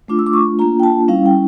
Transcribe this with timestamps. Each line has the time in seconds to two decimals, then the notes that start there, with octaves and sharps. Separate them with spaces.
0.08 A3 D4 F4 D6
0.19 E6
0.26 D6
0.33 C#6
0.59 A#3 D4 F4 A#5
0.80 G5
0.83 A5
1.08 G3 C#4 E4 F5
1.26 G5